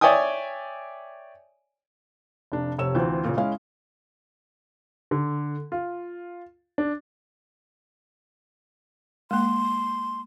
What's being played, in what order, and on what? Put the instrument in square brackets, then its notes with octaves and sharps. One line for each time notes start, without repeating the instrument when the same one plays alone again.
[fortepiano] C#5 D5 E5 G5 G#5 D#6
[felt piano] F1 D4
F1 C3 C#5 E6 E7
D2 E3 C4 F4
A#2 C#3
G#3 C#4 E4 F5
[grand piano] D3
F4
D4
[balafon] G#3 A#3 [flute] C6